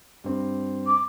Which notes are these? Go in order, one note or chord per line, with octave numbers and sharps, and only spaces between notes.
G2 C4
D6